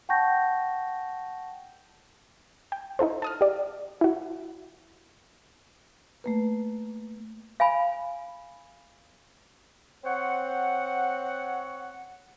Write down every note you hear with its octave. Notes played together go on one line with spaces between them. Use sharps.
F#5 G5 A5 C#6 G6 A#6
G5
D#4 E4 A4 C5
A5 D#6 F6
G4 D5
E4 F#4
A3 A#3 B4
F5 G#5 B5
C4 C#5 F#5